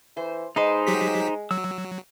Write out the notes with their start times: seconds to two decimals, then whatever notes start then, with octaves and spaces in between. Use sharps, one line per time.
0.17 E3 C5
0.56 G#3 D#4 B4 C5 D#5
0.87 F#3 G4 B6
1.51 F#3 E6